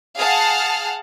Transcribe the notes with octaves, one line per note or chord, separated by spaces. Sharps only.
G#4 F5 F#5 A5 F6